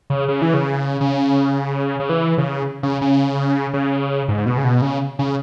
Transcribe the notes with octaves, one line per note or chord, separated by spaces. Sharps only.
C#3
C#3
E3
C#3
C#3
C#3
E3
C#3
C#3
C#3
C#3
G#2
B2
C#3
B2
C#3
C#3